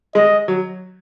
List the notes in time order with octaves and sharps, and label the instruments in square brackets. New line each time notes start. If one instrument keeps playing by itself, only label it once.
[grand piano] G#3 [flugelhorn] D#5
[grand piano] F#3